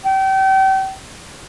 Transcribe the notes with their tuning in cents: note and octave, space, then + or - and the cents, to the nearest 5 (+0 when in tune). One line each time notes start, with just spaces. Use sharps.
G5 -35